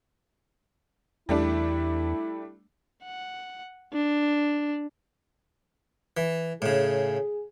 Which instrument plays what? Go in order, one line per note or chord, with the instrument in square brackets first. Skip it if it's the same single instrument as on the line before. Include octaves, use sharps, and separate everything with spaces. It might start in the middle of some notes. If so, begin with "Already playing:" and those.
[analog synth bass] E2 [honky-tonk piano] G3 A3 D4 [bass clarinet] E4
[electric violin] F#5
D4
[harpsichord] E3
[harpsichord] A2 C#3 [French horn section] G#4